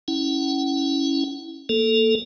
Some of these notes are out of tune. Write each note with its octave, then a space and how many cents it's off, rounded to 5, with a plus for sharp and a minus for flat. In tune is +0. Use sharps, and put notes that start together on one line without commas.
C#4 +0 E4 -10 F#5 +35
A#3 +0 A4 +0